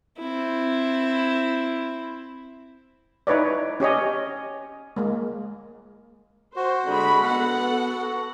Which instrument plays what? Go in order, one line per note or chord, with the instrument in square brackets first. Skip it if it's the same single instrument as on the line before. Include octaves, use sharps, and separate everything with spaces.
[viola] C4 E4
[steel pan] D#4 E4 B4 C#5 D5
C#4 G4 C#5 D#5
G#3 A#3
[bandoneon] F#4 [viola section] C5
[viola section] D3 G#3 B5
B3 A4 F#5